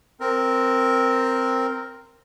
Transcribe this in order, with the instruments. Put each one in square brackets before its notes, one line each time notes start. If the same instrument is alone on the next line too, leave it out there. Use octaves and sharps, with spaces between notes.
[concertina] C4 A#4